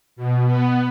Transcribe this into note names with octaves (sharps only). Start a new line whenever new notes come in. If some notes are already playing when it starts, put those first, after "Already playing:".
B2
B3